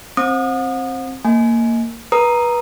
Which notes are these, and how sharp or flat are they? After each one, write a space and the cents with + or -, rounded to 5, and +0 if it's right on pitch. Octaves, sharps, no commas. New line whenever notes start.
C4 +15 D#6 -25
A#3 -15 G#5 +20
B4 -25 A#5 +0 D#6 +0